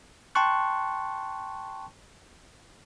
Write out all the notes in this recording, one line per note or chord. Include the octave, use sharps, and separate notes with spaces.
G5 A5 C6 C#6 F#6